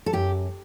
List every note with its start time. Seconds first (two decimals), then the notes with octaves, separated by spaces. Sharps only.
0.06 A4
0.13 F#2 G4